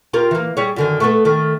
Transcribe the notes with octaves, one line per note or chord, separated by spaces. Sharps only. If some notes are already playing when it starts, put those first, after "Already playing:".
F4 G4 A#4
E3 A#3
G3 G#4 C#5
F#2 D3 D#3
A3 B3 A4
D#3 A3